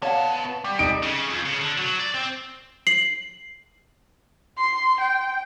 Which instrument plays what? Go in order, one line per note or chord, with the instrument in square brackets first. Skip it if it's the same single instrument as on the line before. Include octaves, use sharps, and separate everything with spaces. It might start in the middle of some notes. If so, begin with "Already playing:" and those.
[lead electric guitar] B3 A5 [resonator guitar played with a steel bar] C#5 F5 F#5
[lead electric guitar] G3
[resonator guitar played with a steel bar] D#4 A4 [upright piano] D7
[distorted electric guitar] C#3
F2
C#3
D3
F#3
D5
C4
[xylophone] C7 F#7
[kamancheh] C6
G5